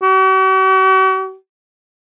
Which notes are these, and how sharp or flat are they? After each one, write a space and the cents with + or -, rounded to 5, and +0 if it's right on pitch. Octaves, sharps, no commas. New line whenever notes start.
F#4 +45